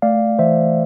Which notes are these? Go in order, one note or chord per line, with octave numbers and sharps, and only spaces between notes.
A3 D5 F5
E3 C5 E5